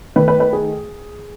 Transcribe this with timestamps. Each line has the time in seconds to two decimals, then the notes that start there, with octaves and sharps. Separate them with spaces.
0.16 D#3 A3 B4
0.28 B4
0.40 B4
0.53 G#4